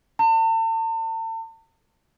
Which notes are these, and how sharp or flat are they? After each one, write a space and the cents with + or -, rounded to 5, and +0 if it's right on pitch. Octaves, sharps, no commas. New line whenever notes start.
A5 +40